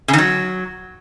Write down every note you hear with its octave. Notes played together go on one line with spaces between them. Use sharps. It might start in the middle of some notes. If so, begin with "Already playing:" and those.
C#3
D#3
F#3